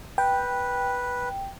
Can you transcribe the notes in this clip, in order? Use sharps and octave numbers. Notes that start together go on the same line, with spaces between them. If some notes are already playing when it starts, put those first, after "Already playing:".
B4 G5